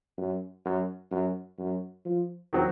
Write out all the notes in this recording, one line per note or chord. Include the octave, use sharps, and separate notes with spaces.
F#2
F#2
F#2
F#2
F3
D#3 F#3 C4